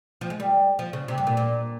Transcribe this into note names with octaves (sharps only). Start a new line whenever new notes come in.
F3
G#3
G3
F3
C#3
C3
G2
A#2
A#2